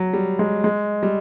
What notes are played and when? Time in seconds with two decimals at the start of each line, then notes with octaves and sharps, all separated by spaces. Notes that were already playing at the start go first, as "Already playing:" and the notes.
Already playing: F#3
0.14 G3
0.39 G#3
0.64 G#3
1.03 G3